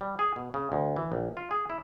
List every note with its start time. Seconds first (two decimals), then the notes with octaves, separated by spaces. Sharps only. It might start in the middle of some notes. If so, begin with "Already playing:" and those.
0.01 G3
0.19 G#4
0.36 B2
0.54 C#3
0.72 D2
0.96 E3
1.12 A#1
1.37 F4
1.51 G#4
1.70 E4